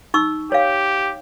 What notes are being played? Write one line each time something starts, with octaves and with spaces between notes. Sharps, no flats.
D#4 C#6 E6
G4 C#5 F5